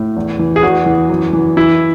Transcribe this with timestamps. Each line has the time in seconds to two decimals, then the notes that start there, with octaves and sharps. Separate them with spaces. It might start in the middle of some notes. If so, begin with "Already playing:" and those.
Already playing: A2
0.16 E2
0.39 E3
0.56 G#4
0.63 E2 F#4
0.86 E3
1.09 F#2
1.33 E3
1.57 E3 E4